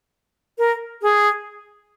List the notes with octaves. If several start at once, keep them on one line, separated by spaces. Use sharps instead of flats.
A#4
G#4